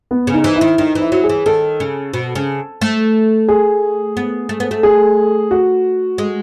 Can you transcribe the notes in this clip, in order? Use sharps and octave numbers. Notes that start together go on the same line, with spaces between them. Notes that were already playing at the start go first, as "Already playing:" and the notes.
B3
C#3
D#4
E3
E4
D#3
D#3 D#4
E3
E4
F#3
G#4
E3
D#3 A4
C#3
B2
C#3
A3
G#4
B3
A3
B3
A3
G#4
F#4
G#3